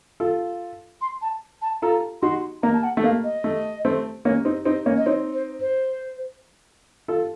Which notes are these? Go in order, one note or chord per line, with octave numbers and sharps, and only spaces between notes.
F4 A4
C6
A5
A5
F4 A4 A#5
D#4 F#4 C6
A#3 A#5
A5
F#5
A3
A#3 F5
D#5
A3
A3 C4
A#3 C#4
C4 D#4
C4 D#4
A#3 C#4
D#5
C4 D#4 C#5
C5
C5
F4 A4